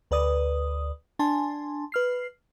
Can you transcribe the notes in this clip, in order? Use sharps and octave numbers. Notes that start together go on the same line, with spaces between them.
D2 B4 D5 D#6
D4 G#5 A5 C6
B4 F6 C7